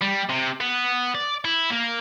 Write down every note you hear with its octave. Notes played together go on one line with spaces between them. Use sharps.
G3
C3
B3
D5
E4
A#3